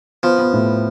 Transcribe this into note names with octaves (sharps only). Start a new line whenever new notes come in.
F3 B3
B3
A2